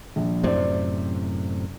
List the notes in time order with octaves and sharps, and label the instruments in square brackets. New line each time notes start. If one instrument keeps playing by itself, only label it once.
[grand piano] A#1
[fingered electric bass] F#2 A2 C3 [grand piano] C5 D5